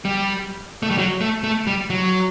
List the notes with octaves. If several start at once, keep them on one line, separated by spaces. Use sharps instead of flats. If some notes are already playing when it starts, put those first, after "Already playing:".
G3
A3
G3
F#3
A3
A3
G3
F#3